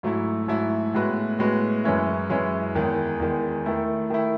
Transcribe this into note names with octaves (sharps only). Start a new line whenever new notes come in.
G#2 F#3 A3 E4
G#2 F#3 A3 E4
A2 G#3 B3 F#4 B4
A2 G#3 B3 F#4 B4
F#2 E3 G#3 C#4 E4
F#2 E3 G#3 C#4 E4
E2 D#3 G#3
E2 D#3 G#3
D#3 A3 E4
D#3 A3 E4